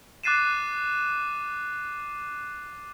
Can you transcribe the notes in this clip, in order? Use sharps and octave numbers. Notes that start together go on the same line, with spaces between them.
D6 F#6 A6 C7 D#7 E7